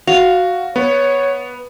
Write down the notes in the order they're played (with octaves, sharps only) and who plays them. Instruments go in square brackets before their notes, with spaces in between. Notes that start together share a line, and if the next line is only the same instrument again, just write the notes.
[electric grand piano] F#4 [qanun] F5
[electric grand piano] B3 [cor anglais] C#5